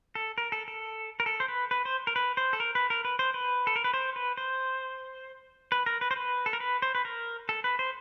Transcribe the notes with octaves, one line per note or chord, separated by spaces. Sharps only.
A4
A#4
A4
A4
A#4
A4
C5
B4
B4
C5
A#4
B4
C5
A4
A#4
B4
A#4
B4
C5
B4
A4
A#4
B4
C5
B4
C5
B4
A#4
B4
C5
B4
A4
A#4
B4
C5
B4
A#4
A4
B4
C5